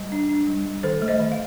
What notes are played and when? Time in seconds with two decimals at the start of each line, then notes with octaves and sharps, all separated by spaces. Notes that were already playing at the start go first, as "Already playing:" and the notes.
Already playing: G3
0.12 D4
0.29 D4
0.47 G3
0.66 G3
0.83 D#3 A4 C5
1.02 A3
1.08 C5 D#5
1.20 D#3
1.32 F5